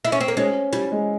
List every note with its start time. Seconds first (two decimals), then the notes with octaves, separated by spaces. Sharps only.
0.05 E4
0.12 C#4
0.21 C4
0.28 A#3
0.37 G#3 C#4
0.73 G3 E4
0.92 G#3